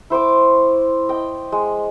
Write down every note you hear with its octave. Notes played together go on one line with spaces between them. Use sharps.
E4 C5 C#6 D6
D#5 G5
G#3